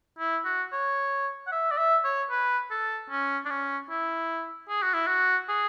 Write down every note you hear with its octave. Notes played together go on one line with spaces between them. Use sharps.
E4
F#4
C#5
F#5
E5
D5
E5
C#5
B4
A4
C#4
D4
C#4
E4
G#4
F#4
E4
F#4
G#4